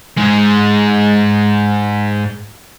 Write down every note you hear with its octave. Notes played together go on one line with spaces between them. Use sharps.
G#2 G#3